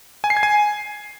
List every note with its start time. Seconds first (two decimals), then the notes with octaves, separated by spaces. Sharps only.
0.24 G#5
0.30 C7
0.37 G#6
0.43 G#5